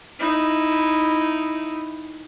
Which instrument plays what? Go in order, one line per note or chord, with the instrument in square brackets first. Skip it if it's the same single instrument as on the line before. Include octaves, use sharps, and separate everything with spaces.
[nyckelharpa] D#4 E4